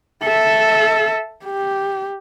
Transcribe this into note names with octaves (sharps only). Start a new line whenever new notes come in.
A4 E5
G4